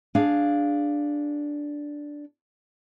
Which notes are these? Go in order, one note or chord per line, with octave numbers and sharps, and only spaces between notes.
D4 G#4 F5